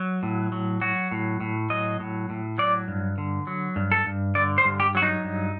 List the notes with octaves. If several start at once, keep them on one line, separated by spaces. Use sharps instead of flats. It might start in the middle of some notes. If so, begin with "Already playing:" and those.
Already playing: F#3
A2
F#3
F#3 F#4
A2
A2
F#3 D#5
A2
A2
F#3 D5
G2
D3
F#3
G2
A4
G2
D3 D5
C5
G2
G4
F#3 F#4
D#4
G2